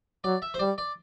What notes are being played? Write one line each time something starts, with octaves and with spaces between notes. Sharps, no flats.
F#3 D5
E5
C5
G3 D5
D5